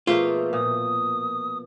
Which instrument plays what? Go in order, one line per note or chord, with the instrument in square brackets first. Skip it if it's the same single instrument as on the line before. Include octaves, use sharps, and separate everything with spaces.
[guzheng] B2 F3 E5 [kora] A3 A#3 [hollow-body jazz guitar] F4 [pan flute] G#4
[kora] A#2 [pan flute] D#6